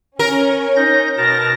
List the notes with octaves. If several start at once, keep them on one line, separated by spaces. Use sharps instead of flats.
C#4 A#4
D#4 G6 A#6
B2 A#4 A5 A#6